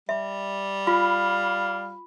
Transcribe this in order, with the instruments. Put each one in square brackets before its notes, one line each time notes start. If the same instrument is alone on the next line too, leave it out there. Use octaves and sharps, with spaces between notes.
[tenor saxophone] G3 [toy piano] E5
[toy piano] F4 [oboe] F5 [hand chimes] B5